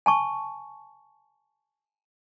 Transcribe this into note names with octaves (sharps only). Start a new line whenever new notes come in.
G#5 A5 C#6